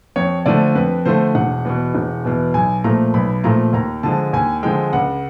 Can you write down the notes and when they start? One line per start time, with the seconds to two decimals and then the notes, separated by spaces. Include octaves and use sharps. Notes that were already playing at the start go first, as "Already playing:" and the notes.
0.16 F2 C#5
0.46 D3 F3 A3 D5
0.75 F2 B4
1.06 D3 F3 A3 C5
1.35 E1 F#5
1.65 E2 B2
1.95 E1
2.25 E2 B2
2.54 B1 G#5
2.84 A#2 F3 A3 A#5
3.14 B1 B5
3.44 A#2 F3 A3 A#5
3.73 D#2 A#5
4.03 D3 F3 G#3 A5
4.33 D#2 G#5
4.63 D3 F3 G#3 G5
4.93 C#2 F#5